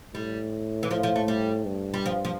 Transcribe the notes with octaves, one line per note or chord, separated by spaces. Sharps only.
A2 G3
E3
A2 F3
F3
A3
G3
G2
G3
F3
F3